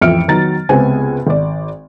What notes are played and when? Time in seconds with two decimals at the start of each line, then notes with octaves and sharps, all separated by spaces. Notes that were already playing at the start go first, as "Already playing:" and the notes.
0.01 A1 F2 E5 F6 C#7 D7
0.28 D#3 F#3 B3 A#5 A6
0.69 C#2 C3 G#3 B3 C5 G#5
1.27 G#1 D5